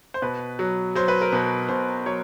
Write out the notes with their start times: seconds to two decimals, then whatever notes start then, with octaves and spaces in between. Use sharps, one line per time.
0.14 C5
0.22 B2 B4
0.59 F#3
0.95 F#3 C5
1.08 B4
1.21 A#4
1.33 B2 B4
1.69 B2 C5
2.06 F#3 C#5